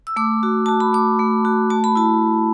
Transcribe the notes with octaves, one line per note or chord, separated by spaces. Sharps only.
E6
A3 D6
F#4
F#4 A5
B5
A3 D6
A3
F#4
A3 A5
B5
E4 A5